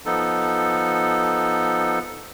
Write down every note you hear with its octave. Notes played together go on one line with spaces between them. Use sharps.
F3 B3 D#4 A4